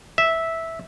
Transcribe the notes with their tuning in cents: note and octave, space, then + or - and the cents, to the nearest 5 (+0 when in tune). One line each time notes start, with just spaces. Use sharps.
E5 -10